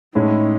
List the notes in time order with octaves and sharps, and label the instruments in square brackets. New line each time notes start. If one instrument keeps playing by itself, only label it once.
[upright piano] A2 G#3 C#4 E4 [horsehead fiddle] D#4